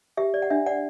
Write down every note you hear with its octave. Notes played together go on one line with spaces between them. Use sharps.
G4 E5
D5
F#5
D4 E5
D5 F#5